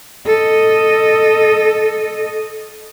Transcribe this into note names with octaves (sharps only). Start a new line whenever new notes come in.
A4 D#5